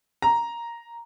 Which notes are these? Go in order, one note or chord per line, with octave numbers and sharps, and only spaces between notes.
A#5